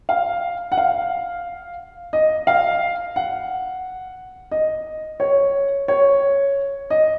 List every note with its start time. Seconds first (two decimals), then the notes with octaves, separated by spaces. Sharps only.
0.09 F5
0.72 F#5
0.77 F5
2.13 D#5
2.47 F5
3.16 F#5
4.51 D#5
5.20 C#5
5.88 C#5
6.90 D#5